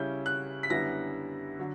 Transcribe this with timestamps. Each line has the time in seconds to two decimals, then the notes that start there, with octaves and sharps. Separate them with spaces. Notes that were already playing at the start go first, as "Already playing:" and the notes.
Already playing: C#3 G3 C#4 E4 G6
0.26 F#6
0.63 B6
0.70 F#2 D3 G3 B3 E4 A#6
1.59 D3 F#3